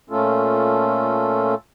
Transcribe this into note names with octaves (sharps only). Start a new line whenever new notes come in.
A#2 A3 C#4 F4 A4